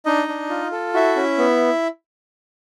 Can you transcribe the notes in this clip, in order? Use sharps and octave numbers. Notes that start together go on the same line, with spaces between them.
D4 D#4 D#5
D4
F4
A4
E4 F#4 E5
C#4
B3